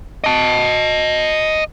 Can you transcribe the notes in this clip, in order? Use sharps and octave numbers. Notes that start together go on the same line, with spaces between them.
D#5 A5